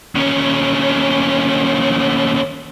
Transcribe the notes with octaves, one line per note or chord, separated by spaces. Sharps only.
D#2 C#4